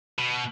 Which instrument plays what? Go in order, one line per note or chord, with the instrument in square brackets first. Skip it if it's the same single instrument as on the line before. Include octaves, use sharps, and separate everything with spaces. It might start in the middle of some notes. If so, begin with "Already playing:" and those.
[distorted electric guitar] B2